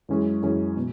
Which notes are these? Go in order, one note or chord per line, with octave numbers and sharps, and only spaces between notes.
F#2 E3 G#3 C#4 G#4
F#2 E3 G#3 C#4 G#4
B2